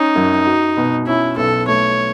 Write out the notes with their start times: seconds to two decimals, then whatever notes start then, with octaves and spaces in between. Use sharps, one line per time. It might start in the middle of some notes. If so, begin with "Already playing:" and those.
Already playing: C#4 D#4
0.15 F#2
0.46 F#4
0.77 B2
1.07 C#4 E4
1.37 B1 A4
1.68 A3 C#5